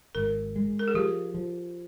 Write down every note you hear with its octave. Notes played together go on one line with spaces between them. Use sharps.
G#1 A#4
G#3
A#4
G#4
F3 G4
F3